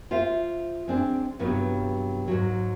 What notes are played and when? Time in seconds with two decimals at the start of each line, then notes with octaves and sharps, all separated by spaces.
0.11 F4 C5 E5 F5
0.88 G#3 C4 D4
1.39 G2 C3 F#3 B3 F4
2.28 G#2 F#3